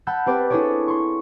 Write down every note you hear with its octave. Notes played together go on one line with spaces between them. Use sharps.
F#5 A5 B5 E6 G6
C4 G4 B4 C5 D5
D4 E4 G#4 A4 C#5 D5
C6 C#6